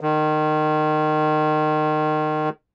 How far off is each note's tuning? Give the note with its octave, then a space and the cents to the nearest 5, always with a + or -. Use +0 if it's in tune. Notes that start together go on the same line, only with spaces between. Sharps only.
D#3 -25